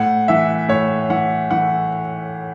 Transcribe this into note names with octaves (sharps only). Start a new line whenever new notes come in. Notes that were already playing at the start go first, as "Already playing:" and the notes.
Already playing: A2 F#5
E3 E5
A2 C#5
E3 F#5
E3 F#5